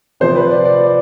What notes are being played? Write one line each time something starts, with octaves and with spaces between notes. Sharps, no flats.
C3 F3 C5
B4
D5
D5
D5